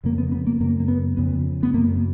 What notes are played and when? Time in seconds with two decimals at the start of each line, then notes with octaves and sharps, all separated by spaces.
0.04 F2 C#3 A#3
0.18 B3
0.32 B3
0.47 A#3
0.60 F#2 C#3 A#3
0.80 A#3
0.88 B3
1.17 F2 C#3 B3
1.63 B3
1.74 F#2 C#3 A#3